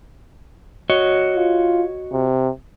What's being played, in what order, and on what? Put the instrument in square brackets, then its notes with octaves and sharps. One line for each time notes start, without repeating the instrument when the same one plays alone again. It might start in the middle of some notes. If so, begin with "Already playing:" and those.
[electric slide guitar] F#4 C#5 D#5
[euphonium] F4
C3